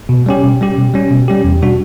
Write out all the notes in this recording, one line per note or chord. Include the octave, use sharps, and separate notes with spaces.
B2
G3 C#4 G4
B2
G3 C#4 G4
B2
G3 C#4 G4
B2
G3 C#4 G4
E2
B2 G3 D4 F#4